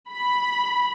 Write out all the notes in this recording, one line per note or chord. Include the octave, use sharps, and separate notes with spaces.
B5